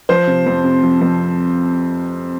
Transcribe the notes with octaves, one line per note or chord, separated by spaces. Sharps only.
F3 C5
C3
F2
C3
F3
F2